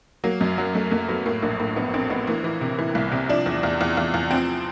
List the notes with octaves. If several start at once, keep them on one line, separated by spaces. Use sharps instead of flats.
F#3 A#3
F#2
F#3
F#2 A3
F#2 A#3
F#3 B3
A2 A#3
A#1 A#3
A2 A#3
A#1 B3
A#1 C4
A#1 B3
E3 A#3
E3
C3
E3
C2
C3
F3 D4
E2
E2
E2
E2
E2
F3 C4